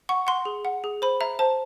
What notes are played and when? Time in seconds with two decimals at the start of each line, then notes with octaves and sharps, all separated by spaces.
0.09 F#5 C#6
0.27 F#5 C6
0.45 G#4
0.65 F#5
0.84 G#4
1.02 C5 B5
1.21 E5 A#5
1.39 C5 A5